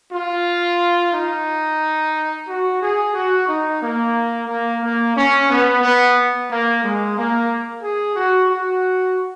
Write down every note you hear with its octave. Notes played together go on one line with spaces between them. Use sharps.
F4
D#4
F#4
G#4
F#4
D#4
A#3
A#3
A#3
C#4
B3
B3
A#3
G#3
A#3
G#4
F#4
F#4